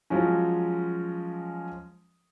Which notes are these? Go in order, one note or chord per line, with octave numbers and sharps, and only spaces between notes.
F3 F#3 G#3 C#4